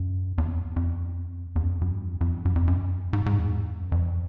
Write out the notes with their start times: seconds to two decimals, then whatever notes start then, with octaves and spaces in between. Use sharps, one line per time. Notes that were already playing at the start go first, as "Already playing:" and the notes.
Already playing: F#2
0.38 E2
0.51 F2
0.76 F2
1.56 E2
1.63 F#2
1.69 F2
1.81 F#2
1.95 G2
2.08 F2
2.21 F2
2.34 G2
2.45 F#2
2.56 F2
2.68 F#2
3.13 G#2
3.26 G#2
3.38 E2
3.80 F#2
3.92 F2